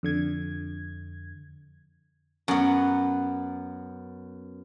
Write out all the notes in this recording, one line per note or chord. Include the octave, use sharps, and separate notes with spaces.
F2 D3 G#6
F#2 B3